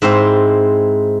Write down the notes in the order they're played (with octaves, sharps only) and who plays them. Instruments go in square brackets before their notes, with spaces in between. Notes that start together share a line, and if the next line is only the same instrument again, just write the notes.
[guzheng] G#2 C4 E4 C5